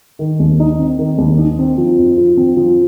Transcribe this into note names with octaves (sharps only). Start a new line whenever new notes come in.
D#3
D#2
D#4
C4
D#3
D#2
D#4
C4
F3
F2
F4
C4
F3